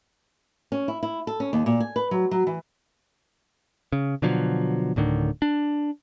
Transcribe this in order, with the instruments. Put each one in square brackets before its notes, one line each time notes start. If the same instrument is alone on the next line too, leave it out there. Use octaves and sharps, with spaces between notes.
[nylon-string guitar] C#4
E4
E4
A4
C#4
D#2
A#2
G#5
B4
F#3
F#3
E3
[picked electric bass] C#3
B2 D3 F3 F#3
D1 A2 D3 D#3
D4